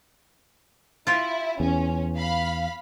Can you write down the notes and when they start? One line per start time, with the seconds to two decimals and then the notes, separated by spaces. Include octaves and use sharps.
1.07 E4 F4 G4
1.60 E2 C#4
2.17 F5 B5